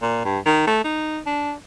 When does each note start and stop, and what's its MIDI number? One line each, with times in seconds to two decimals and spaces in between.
0.02 0.23 46
0.25 0.39 43
0.45 0.64 51
0.67 0.81 57
0.84 1.19 63
1.26 1.53 62